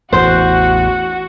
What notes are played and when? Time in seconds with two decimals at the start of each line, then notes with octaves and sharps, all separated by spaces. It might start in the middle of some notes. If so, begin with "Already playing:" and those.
0.13 A1 E2 F#4 C5 F#5